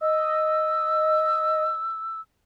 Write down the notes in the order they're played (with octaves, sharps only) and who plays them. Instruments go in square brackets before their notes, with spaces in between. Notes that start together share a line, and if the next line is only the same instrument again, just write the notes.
[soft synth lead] D#5 [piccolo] E6